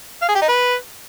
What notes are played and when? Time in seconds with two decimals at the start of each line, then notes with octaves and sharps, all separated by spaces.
0.22 F5
0.28 G#4
0.35 G4
0.42 D#4
0.48 B4